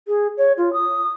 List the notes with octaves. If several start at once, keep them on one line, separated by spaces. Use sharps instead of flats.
G#4
C#5
F4
D#6